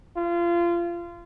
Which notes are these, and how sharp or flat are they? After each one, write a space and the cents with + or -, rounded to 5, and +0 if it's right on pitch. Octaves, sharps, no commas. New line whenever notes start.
F4 -25